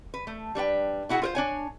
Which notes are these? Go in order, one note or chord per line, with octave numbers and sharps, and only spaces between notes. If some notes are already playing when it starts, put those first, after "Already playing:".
B4
A3
G3 D4 B4 G5
B2 E4 F#4 G#4 F#5
F4 A#4 C5
D4 C#5 G#5